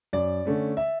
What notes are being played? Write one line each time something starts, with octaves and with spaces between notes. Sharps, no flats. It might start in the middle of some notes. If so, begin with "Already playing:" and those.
F#2 D5
D3 A3 C#4
E5